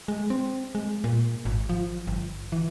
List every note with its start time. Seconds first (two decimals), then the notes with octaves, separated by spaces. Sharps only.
0.08 G#3
0.30 C4
0.75 G#3
1.04 A#2
1.45 G#1
1.69 F3
2.07 G1
2.52 E3